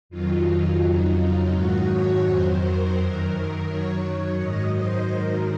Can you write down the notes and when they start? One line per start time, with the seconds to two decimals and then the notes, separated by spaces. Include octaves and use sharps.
0.09 F2 D#3 F#3 F4
0.45 F4
0.81 F2 C#3 F#3 D#4
1.18 F4
1.53 G#2 D#3 F#3 F#4
1.89 C#5
2.25 F2 D#3 F#3 C5
2.61 A#4
2.96 F#2 D#3 F#3 A#4
3.67 F#2 D#3 F#3 C#5
4.04 C#5
4.39 G#2 D#3 F#3 D#5
4.75 C5
5.11 G#2 D#3 F#3 A#4